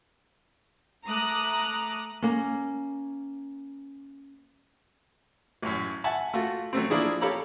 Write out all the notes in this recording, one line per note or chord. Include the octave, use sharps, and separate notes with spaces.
A3 A#5 D6 D#6 F#6
A#3 C#4
A1 F#2
E5 F#5 G#5 A5
A3 F4 F#4
F#3 A3 C4
F3 A#3 D4 E4 G#4
G4 A4 C#5 F5 A#5 B5